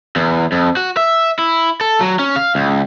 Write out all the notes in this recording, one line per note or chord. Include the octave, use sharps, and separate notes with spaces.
E2
F2
F#4
E5
E4
A4
F#3
C#4
F5
C#2